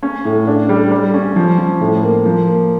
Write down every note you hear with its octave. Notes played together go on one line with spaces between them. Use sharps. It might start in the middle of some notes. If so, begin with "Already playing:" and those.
C#4
A2
D4
G3
G3
C#4
F3
F3
A2
A#3
F3
A#3